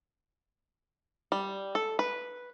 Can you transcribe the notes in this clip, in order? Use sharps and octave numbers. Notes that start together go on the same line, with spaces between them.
G3
A4
B4